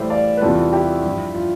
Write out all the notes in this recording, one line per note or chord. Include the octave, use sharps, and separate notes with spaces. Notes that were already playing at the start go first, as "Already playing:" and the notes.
Already playing: A2 E3 G3 C5 E5
D5 F5
B4
E2 C3 E3 G3 F4 A4
E4 G4
G2 F3
F4